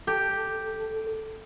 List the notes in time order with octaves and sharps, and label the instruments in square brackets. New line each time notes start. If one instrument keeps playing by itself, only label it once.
[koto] G4 [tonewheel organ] A4